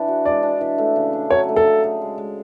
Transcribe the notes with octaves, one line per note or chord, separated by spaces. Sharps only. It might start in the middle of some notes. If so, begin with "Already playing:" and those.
Already playing: E3 D4
F#4
G#3 D5
D4
E3
A3
C#3
D4
F#3 C#5
A3
A4
C#3
G#4
G#3
G#3